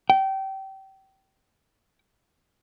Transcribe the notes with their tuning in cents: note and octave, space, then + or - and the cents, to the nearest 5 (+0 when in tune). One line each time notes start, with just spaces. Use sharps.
G5 -25